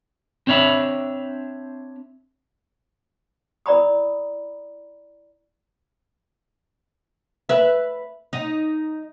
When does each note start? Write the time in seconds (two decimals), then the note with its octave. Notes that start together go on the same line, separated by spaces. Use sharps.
0.47 C4 D4 C#5 E5 B5
3.66 E4 A#4 D5 A#5 B5 D#6
7.49 B4 E5
8.33 D#4